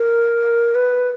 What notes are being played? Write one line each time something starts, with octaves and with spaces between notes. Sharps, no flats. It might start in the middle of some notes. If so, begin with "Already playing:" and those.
Already playing: A#4
B4